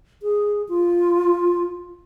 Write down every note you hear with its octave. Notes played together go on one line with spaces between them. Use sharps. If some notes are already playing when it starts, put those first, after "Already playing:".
G#4
F4